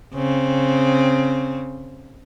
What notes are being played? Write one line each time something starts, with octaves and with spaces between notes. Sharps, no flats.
C#3 C4